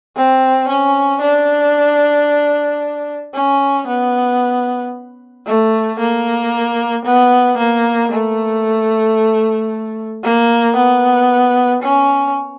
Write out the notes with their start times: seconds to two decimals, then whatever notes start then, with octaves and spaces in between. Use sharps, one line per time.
0.17 C4
0.69 C#4
1.22 D4
3.34 C#4
3.87 B3
5.46 A3
5.99 A#3
7.06 B3
7.58 A#3
8.12 A3
10.24 A#3
10.77 B3
11.83 C#4